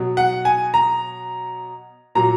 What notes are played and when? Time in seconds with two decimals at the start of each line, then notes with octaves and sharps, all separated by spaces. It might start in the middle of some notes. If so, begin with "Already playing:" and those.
Already playing: B2 F#3
0.17 F#5
0.45 G#5
0.74 A#5
2.15 A#2 F#3 A#5